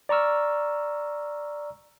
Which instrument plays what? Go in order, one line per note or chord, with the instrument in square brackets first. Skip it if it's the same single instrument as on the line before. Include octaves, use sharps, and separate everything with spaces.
[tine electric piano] D5 A#5 C#6 E6 F6